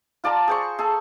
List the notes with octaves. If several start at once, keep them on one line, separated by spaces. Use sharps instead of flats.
F4 D5 A5 A#5
G#4 C5 C#6
G#4 A4